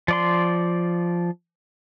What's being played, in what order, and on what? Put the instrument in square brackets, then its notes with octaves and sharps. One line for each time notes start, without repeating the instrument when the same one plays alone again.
[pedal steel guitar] F3 D5 C6